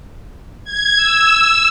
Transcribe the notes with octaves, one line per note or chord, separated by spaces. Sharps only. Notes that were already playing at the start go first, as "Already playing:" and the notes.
G#6
E6